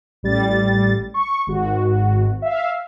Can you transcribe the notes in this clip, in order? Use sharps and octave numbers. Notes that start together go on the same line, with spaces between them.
A1 G3 A6
C#6
G#1 F#4
E5 F5